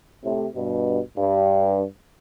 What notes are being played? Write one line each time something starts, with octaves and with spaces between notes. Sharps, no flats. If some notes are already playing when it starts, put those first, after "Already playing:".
A2 C3
G2 B2
G2